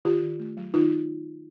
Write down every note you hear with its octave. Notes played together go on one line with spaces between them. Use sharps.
D#3 F4 G4
D#3
A3
F#3
D#3 D#4 F4